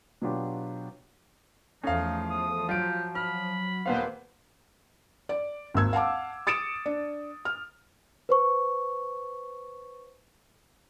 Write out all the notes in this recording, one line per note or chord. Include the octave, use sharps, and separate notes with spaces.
B2 F#3 B3 D4 F4 G4
E2 F3 A3 C#4 D#4 F5
D#6
F#3 F4 G4 D7
B5 F6
D#1 A#3 B3 B4 C5 F5
D5
G#1 D#2 E6 G#6
F5 F#5 A5 D6
D#6 A6 C#7 D7 E7
D4
F6
B4 C5 C#6